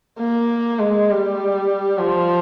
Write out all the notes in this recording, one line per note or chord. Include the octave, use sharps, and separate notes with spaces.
A#3
G#3
G3
F3